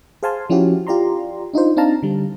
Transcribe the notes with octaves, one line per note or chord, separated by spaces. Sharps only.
G#4 C5 F5 G#5 A5 C6
F3 C#4 E4 F#4 G4
F4 G4 D5 A#5 C6
D4 D#4 F4 C5
C4 D4 D#4 F5 A5 A#5
D3 G3